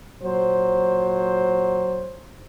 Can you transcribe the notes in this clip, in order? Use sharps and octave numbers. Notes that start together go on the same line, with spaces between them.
A#2 F#3 C5